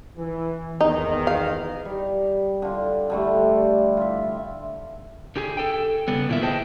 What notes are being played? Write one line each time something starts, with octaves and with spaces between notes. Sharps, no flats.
E3
E2 G#2 D#3 D#4
F5
G3
D3 F4
D3 G3 A3
F4 E5
D3 G4 G#4
A4 G5
C#3 G3 B3
A#2 D#3 E4 F4 A#4 E5
G#4 B4 C5 D#5 G5 A5